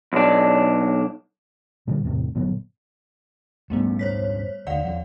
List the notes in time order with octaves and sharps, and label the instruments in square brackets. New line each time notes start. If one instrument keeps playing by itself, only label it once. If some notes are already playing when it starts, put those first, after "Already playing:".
[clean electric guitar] B1 D4
[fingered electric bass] A#2 D3 E3 G3
E2 A2 C3
G1 A#2 F#3 B3
[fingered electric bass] F2 G#2 D4 [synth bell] G3 A3 B3
[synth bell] C5 C#5 B6
[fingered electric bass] D#2 D3 [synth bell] D5 F5 F#5
[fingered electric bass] E2 F3